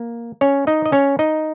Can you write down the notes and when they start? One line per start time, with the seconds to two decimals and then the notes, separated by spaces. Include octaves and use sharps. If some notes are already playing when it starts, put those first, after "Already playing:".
Already playing: A#3
0.41 C#4 C#5
0.67 D#4 D#5
0.86 D#5
0.92 C#4 C#5
1.19 D#4 D#5